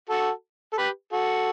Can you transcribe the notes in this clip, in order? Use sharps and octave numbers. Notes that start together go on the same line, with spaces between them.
F#4 A4
A4
G4 B4
F#4 A4